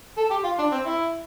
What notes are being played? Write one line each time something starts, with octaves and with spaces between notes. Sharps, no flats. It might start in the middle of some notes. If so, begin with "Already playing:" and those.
A4
G4
F4
D4
C4
E4